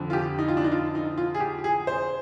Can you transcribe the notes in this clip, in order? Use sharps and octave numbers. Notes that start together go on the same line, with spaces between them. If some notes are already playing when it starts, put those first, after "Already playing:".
Already playing: F2 D3 F3
F4
G4
D#4
F4
D4
D#4
F4
D#4
F4
G#4
G4
G#4
C5